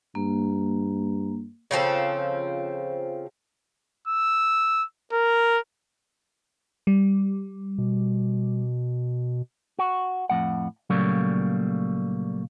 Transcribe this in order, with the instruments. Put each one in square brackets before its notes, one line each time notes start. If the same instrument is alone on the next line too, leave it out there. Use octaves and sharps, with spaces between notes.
[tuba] G2 [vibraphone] A#3
[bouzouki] C#3 F3 C4 A4
[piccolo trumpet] E6
A#4
[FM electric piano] G3
[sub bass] B2
[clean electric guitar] F#4
F2 A2 F#5
A#2 C#3 F#3 G3 A3 A#3